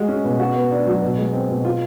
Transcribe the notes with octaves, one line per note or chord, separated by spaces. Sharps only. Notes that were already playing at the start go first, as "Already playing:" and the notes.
Already playing: G#3 F#4
C#4
B2
F#4
B3
D4
F#3
B2
G#3
C4
B2
F4